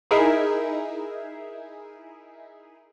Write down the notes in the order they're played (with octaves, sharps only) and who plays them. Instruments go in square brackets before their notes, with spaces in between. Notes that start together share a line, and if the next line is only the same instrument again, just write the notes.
[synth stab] D#4 E4 G#4 A#4 E5